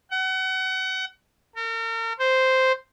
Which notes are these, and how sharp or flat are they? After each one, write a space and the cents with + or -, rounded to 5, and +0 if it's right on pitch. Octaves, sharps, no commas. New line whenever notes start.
F#5 +30
A#4 -40
C5 -5